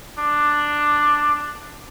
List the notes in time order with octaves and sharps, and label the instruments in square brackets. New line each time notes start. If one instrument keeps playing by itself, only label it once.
[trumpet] D4